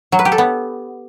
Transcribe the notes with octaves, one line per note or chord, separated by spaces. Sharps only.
F#3
B4
G4
A4
B3